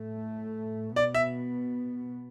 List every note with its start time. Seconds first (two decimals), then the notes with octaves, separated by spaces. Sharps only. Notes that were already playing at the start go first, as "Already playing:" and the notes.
Already playing: A2 A3
0.96 B2 B3 D5
1.14 E5